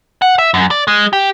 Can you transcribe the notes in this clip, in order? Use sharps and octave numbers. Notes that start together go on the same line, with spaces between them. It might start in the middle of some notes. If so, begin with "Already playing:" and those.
F#5
E5
F#2
D5
G#3
G4